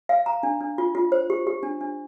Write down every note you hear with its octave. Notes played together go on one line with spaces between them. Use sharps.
F5
A#5
D4
D4
F4
F4
C5
G4
G4
D4
D4